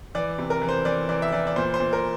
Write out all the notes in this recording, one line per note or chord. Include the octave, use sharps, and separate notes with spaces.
E3 D5
C3
A#4
E3
C5
E3 D5
E3 D5
E5
E3 D5
D5
A#2 C5
C5
A#2
A#4